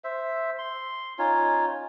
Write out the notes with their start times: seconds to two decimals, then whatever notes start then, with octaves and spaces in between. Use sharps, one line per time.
0.04 C5 E5
0.59 C6
1.19 C#4 D#4 F4 C#5